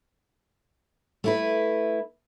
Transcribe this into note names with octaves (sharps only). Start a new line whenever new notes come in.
A3 E4 B4